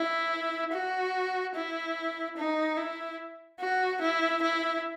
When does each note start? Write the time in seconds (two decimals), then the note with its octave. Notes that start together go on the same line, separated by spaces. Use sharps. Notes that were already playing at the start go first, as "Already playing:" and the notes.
Already playing: E4
0.72 F#4
1.54 E4
2.37 D#4
2.77 E4
3.60 F#4
4.01 E4
4.42 E4